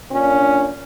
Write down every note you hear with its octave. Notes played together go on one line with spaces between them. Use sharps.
A#2 C#4 D4